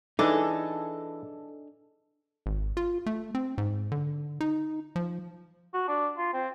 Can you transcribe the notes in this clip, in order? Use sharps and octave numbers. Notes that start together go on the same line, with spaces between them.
E3 D4 D#4 G#4 A4
G#1
F4
A3
C4
G#2
D3
D#4
F3
F#4
D4
F4
C4